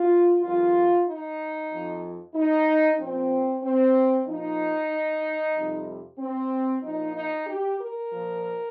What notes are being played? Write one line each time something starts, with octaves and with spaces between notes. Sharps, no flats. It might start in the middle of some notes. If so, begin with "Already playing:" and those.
Already playing: F4
F2 D#3 G3 F4
D#4
F2 F3
D#4
A#2 F3 C4
C4
A#2 F3 D#4
F2 C3 G3
C4
A#2 F3 D#4
D#4
G4
A#4
A#2 F3